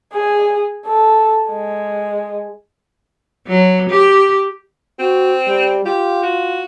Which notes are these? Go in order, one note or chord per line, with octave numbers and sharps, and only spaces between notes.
G#4
A4
G#3
F#3
G4
C4 F#4
G3
F4 G4
F#4